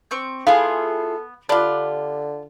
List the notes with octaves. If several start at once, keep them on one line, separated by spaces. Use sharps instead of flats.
C4 C#6 G6
B3 E4 F4 G#4 A4 F5
D3 D4 F4 G4 B5 F#6